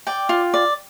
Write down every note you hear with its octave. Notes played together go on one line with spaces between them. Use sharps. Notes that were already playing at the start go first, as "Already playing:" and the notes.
D5 G5
F4
D5